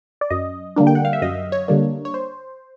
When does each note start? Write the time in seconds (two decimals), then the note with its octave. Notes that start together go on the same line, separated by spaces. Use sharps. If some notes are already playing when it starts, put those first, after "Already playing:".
0.21 D5
0.30 F#2 D#5
0.76 D3 G3 A#3 D4
0.87 G5
0.95 F#5
1.05 F5
1.13 E5
1.22 F#2 D#5
1.52 C#5
1.68 D3 G3 A#3 D4
2.05 C#5
2.14 C5